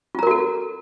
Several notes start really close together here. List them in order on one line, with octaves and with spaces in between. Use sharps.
F4 A#5 A#4 F#4 A4